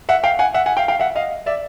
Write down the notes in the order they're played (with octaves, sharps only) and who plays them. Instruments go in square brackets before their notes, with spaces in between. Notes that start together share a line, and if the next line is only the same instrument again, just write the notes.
[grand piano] E5 F#5
F5 G5
F#5 G#5
E5 F#5
F#5 G#5
F5 G5
F5 G5
E5 F#5
D#5 F5
D5 E5